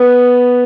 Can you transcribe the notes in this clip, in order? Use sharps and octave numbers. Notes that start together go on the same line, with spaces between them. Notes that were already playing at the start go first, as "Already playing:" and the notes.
Already playing: B3